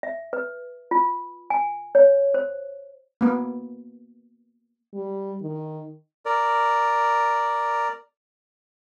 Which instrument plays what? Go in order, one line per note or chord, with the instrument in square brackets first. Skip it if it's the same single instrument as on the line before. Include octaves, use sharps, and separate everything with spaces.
[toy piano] E5
B4
F4
G#5
C#5
C5
[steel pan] A#3 B3
[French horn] G3
D#3
[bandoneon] A#4 D5